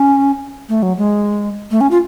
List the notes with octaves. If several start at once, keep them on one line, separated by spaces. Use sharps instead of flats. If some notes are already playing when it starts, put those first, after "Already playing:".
Already playing: C#4
A3
F#3
G#3
A3
C#4
F4